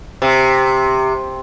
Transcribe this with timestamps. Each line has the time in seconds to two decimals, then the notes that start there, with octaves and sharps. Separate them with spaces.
0.22 C3